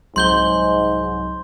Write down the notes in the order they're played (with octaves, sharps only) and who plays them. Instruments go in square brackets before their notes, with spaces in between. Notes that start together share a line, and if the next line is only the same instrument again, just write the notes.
[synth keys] C2 F#3 [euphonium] G#2 [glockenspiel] C6 G6 G7